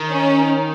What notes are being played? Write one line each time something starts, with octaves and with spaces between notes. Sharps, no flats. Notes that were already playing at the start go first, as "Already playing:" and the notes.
Already playing: D#3
C#4